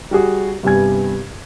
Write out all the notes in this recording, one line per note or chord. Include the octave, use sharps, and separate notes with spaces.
G3 F#4 G#4
G2 C3 G3 B3 G#5 G#6